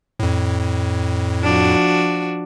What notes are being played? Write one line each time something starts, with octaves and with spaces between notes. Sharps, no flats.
F2 A2
F3 D4 F#4